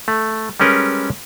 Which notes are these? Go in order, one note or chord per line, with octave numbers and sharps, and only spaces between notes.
A3
G3 G#3 C#4 A#4 B4